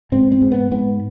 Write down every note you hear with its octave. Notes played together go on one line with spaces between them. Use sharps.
G#2 C4
C4
G#2
B3
G#2 B3